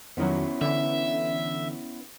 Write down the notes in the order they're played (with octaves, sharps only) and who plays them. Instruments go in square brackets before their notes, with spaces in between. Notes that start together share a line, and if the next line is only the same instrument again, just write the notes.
[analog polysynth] F2 D#3 F#3 [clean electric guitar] B3 C#4 E4
[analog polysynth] D3 E3 [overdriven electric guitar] E5